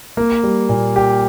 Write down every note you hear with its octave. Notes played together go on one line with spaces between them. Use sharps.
A#3
G3
A#2
G4